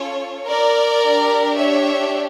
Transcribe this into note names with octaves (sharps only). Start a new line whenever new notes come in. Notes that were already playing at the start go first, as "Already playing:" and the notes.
Already playing: C#4 F4 A4 C#5
A#4 D5
D4 G4
C#5 E5